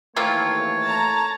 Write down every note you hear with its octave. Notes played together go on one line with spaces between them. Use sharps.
D#2 E3 A3 A#3 C4 F4 C#5
A5 A#5